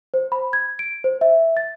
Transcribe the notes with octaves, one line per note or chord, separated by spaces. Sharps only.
C5
B5
G#6
D7
C5
E5
A6